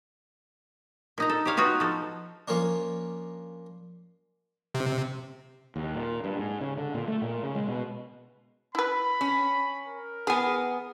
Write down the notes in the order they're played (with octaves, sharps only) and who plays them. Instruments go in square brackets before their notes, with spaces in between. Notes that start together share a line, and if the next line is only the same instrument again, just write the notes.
[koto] A#2 D#4 A#5
A4
G4 C5 C#5 F5
B3 D#4 F4 F#4 C#5
F3 A4
[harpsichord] F3 A#3 C#4 D4
[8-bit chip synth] C3
[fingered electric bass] D#2
A#2
G2
G#2
C#3
D3
A#2
A3
A#2
C#3
G#3
B2
[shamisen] E4 B4 [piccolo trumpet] B5
[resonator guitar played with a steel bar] C#4
[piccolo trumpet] A#4
[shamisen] E3 G#5 [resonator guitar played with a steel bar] B3 G#4